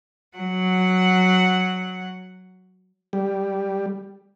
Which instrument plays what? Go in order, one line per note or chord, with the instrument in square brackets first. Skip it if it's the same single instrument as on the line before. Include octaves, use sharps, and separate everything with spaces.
[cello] F#3 F#5
[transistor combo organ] G3